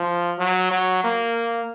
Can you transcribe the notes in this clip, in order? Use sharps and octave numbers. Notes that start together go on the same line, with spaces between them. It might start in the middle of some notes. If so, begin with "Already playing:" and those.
Already playing: F3
F#3
F#3
A#3